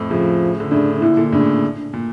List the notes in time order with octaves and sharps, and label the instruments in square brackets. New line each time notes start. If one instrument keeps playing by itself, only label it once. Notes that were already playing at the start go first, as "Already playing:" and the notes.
Already playing: [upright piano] F2 A2
[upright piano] A2 C#3 [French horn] F3
[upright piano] D3
[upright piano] A2 C#3 [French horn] D4
[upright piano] A#2 D3 [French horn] E4
[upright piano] A#2 D3
[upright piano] A2 C#3 [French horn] D4
[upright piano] A#2